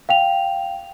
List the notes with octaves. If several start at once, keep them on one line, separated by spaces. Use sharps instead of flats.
F5 G5 F7